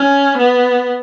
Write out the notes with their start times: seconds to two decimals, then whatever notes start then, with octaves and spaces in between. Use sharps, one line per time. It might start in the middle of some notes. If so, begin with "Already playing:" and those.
Already playing: C#4
0.38 B3